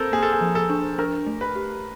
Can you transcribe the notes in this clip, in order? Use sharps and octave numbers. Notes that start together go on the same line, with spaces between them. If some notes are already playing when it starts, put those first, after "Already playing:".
Already playing: C4 A4 A#4 C5
A#3 G#4
A4
G#4
F3
A4
D4
D4 A#4
A3
B4
G4